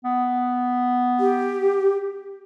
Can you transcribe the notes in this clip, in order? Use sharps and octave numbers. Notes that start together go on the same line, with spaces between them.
B3
G4